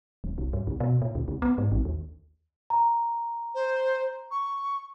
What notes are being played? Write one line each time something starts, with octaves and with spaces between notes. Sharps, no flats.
D#1
C2
G2
C#2
B2
A#2
D2
C#2
B3
G#2
A1
D#2
A#5
C5
C#6